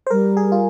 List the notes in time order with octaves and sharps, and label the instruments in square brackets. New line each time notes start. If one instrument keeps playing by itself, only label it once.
[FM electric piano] C5
[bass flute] G3 [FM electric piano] A#4
[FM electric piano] G#4
F4